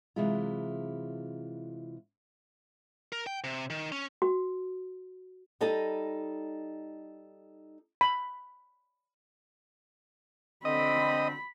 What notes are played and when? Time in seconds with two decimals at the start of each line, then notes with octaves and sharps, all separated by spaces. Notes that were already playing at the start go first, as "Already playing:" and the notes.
0.16 C3 E3 F#3 G#3 E4 F4
3.12 A#4
3.27 G5
3.44 C3
3.70 D#3
3.92 C#4
4.22 F#4
5.61 G3 D#4 A4 D#5 A5
8.01 B5
10.65 D3 C4 D#5 B5